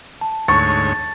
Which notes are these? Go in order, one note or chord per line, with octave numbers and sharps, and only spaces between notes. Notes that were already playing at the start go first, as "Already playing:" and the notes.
A5
D2 G#2 C#5 C#6 A6